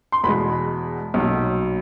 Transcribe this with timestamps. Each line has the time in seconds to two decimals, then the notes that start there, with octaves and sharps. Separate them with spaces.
0.12 C6
0.24 E2 B2 G#3 B5
1.14 B1 A#2 F#3